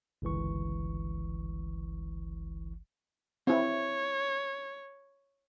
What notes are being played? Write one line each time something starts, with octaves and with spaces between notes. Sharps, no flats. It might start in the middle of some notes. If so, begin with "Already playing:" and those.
G1 C#2 E3 C#6
C4 E4 C#5